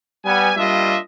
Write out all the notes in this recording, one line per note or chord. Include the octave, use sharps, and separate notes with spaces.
G3 B3 G#5
G3 A#3 D4 F4 D#5 E5